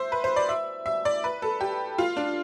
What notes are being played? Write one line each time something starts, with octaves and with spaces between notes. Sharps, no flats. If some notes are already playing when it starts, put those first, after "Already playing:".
Already playing: C5 E5
B4
C5
D5
E5
E5
D5
B4
A4
G4
F4
D4